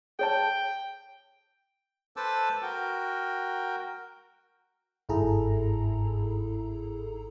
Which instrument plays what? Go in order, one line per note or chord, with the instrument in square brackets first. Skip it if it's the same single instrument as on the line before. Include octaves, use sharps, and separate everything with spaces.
[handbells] G#4 C#5 A5 [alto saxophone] G5
[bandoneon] A4 B4 C5 A5 D6 E6
F#4 A#4 G5
[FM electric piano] G1 G#2 E4 G#4 A4 A#5